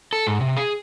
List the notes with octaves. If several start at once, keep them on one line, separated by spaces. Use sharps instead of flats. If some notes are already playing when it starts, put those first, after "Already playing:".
A4
G#2
C3
G#4